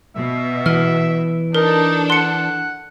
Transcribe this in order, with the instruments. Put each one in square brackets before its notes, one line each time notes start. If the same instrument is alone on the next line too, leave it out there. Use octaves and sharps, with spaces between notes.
[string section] B2 [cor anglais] E5
[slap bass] E3 [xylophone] F6
[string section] D4 A4 [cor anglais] D#4 [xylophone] A#4
[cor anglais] F#5 [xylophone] C6 C#7